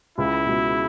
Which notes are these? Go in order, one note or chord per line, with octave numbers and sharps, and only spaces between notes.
C#2 E4
B2 G#3